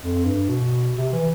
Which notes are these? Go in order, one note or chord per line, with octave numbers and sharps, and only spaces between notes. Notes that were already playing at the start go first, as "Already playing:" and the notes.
F2
G2
B2
C3
E3